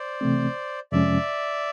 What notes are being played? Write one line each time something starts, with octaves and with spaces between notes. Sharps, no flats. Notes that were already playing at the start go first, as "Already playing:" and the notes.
Already playing: C5 D5
C3 E3 A3 C4
F2 C3 F3 G#3 C#4 D5 E5